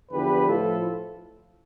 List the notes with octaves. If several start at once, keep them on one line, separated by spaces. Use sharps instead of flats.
E2 D3 F3 G4 B4
A2 F3 F4 A4